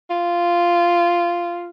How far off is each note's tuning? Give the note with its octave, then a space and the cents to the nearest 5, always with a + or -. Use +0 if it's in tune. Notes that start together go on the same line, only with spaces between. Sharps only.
F4 -10